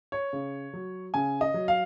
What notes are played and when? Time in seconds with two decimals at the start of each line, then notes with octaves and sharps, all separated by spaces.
0.12 C#5
0.33 C#3
0.73 F#3
1.14 C#3 G#5
1.41 D#5
1.54 F#3
1.68 F5